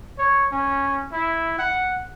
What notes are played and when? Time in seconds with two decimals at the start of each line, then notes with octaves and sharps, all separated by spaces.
0.18 C#5
0.52 C#4
1.12 E4
1.58 F#5